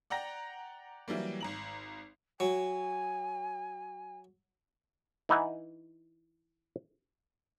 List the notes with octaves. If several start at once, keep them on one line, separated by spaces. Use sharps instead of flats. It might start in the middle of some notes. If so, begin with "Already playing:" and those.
D5 F#5 G5 A#5 A#6
E3 F#3 G3 A#3
G#1 A#5 F#7
F#3 G#5
E3 D#4 E4 F#5 G#5